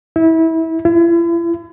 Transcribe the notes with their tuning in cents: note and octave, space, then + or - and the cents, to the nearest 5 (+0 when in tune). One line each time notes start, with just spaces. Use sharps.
E4 -25
E4 +40